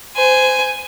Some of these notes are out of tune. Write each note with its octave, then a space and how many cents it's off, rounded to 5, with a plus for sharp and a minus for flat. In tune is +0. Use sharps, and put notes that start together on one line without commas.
C5 -25 G#5 +0